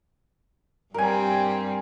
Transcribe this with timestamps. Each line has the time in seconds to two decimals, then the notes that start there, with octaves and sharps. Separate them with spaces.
0.94 G2 G3 C4 A#4 G#5